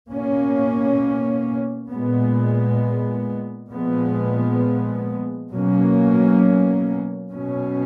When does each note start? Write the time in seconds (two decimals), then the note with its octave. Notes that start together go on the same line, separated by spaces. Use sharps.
0.10 B2 A#3 C#4
1.90 A#2 G#3 B3
3.71 A#2 F3 G#3 B3
5.51 B2 F#3 A#3 C#4
7.32 B2 F#3 C#4